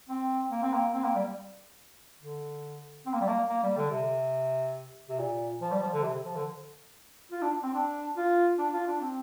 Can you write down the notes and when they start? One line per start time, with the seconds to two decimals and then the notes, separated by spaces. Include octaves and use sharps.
0.09 C4
0.51 A#3
0.62 C4
0.73 A#3
0.94 C4
1.04 A#3
1.15 G3
2.21 D3
3.06 C4
3.13 A#3
3.21 G3
3.28 A#3
3.49 A#3
3.63 G3
3.77 D3
3.91 C3
5.09 C3
5.19 A#2
5.62 F3
5.72 G3
5.82 F3
5.94 D3
6.04 C3
6.25 F3
6.36 D3
7.31 F4
7.42 D4
7.63 C4
7.74 D4
8.17 F4
8.59 D4
8.73 F4
8.87 D4
9.01 C4